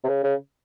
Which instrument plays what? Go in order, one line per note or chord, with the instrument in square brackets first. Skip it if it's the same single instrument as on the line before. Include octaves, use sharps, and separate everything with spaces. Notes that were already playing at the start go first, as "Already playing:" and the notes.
[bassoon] C3
C#3
C#3